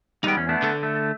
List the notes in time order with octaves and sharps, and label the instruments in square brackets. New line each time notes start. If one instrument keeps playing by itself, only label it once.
[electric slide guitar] G3 G#3 B3 [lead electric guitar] D#4 G5
[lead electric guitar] E2 [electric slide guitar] C#4
[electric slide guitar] A3 B3 D4
[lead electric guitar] D3 A4
[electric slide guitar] A3